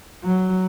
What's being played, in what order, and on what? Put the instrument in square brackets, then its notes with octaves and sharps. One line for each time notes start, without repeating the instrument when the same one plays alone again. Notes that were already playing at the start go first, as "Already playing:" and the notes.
[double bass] F#3